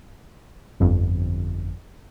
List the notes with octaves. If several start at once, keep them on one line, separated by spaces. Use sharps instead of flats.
G1 F2